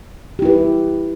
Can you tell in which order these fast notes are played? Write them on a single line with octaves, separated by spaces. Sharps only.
G4 E4 B4